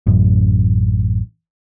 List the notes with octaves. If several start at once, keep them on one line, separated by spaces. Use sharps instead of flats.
A1 F#2